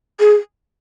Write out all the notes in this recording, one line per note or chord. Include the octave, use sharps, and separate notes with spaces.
G#4